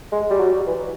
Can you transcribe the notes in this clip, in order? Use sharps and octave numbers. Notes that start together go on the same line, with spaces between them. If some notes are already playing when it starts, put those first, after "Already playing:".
G#3
G3
F#3
E3